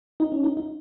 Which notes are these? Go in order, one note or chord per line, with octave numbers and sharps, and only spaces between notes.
D#4
C#4
D#4
D#4